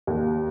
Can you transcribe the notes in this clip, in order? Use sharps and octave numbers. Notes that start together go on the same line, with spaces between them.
D#2